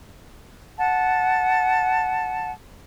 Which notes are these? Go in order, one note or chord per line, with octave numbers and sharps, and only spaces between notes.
F#5 A5